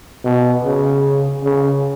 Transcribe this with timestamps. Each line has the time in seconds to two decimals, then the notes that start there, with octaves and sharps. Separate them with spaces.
0.25 B2
0.64 C#3
1.44 C#3